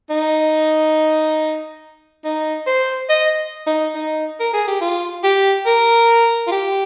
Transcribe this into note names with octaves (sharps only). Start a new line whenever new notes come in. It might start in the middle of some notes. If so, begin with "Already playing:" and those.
D#4
D#4
C5
D#5
D#4
D#4
A#4
G#4
G4
F4
G4
A#4
F4
G4